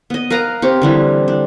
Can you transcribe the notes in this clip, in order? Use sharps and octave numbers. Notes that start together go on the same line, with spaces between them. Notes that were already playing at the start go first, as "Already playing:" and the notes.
B3 D#5
A#4 B4 F5 A#5
C4 G4 C#5
D3 E3 G3
D4